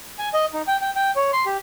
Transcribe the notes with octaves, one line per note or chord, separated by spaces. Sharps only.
G#5
D#5
D#4
G5
G5
G5
C#5
C6
G4